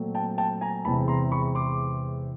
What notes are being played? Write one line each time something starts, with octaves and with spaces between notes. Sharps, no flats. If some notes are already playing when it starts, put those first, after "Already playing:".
Already playing: A#2 F#3 A3 C4
G5 A5
G5 A5
G#5 A#5
E2 C3 E3 G#3 C4 A5 B5
A#5 C6
B5 C#6
C6 D6